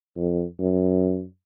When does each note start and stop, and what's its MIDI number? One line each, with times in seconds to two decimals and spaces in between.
0.16 0.44 41
0.60 1.23 42